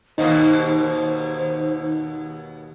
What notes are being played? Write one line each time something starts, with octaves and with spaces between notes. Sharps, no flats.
D#2 B2 A#3 D#4 C5